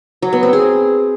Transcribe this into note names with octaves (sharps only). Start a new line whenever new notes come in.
F#3
B3
C4
G#4